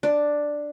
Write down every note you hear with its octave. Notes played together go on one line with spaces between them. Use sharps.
D4